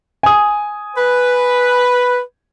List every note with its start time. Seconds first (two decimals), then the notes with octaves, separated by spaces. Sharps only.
0.23 G#5 D#6
0.97 B4